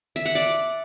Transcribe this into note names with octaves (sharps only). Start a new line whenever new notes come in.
E5
F#5
D5